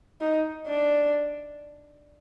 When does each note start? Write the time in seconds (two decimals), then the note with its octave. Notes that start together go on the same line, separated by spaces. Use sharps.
0.21 D#4
0.67 D4